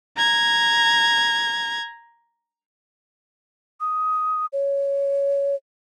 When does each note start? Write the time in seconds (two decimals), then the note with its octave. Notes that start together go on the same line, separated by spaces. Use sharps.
0.17 A#5 G#6
3.80 D#6
4.53 C#5